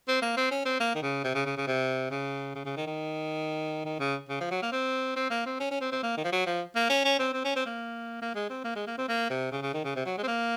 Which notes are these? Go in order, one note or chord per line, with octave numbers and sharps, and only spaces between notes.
C4
A#3
C4
C#4
C4
A#3
D#3
C#3
C3
C#3
C#3
C#3
C3
C#3
C#3
C#3
D#3
D#3
D#3
C#3
C#3
F3
F#3
A#3
C4
C4
A#3
C4
C#4
C#4
C4
C4
A#3
D#3
F3
F#3
F3
A#3
C#4
C#4
C4
C4
C#4
C4
A#3
A#3
G#3
C4
A#3
G#3
A#3
C4
A#3
C3
C#3
C#3
D#3
C#3
C3
F#3
G#3
C4
A#3